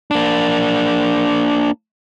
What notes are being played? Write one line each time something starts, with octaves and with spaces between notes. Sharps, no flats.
A#3 D4